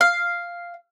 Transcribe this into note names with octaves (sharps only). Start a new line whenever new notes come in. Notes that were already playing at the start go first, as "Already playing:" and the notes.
F5